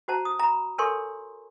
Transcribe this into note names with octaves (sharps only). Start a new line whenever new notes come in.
F#4 C5 A5 A#5
D#6
A#5 B5
A4 A#4 C#5 G#5 C6 C#6